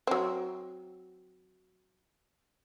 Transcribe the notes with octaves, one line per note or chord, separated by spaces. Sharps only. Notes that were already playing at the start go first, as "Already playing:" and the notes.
F#3 C4